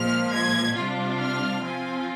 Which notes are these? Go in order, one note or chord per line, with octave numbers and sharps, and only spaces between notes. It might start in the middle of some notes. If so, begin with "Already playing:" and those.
Already playing: A#2 F3 G#3 F6
G#6
C3 G3 D4 F4
F6
F3 C4 F4 G#5